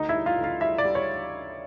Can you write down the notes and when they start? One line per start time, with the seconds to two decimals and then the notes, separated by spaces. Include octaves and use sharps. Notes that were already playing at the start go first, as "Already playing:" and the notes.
Already playing: D2 D#4 D#5
0.09 E4 E5
0.15 G3
0.26 F4 F5
0.38 D2
0.44 F4 F5
0.61 G3 E4 E5
0.78 D5
0.85 G3
0.95 C#5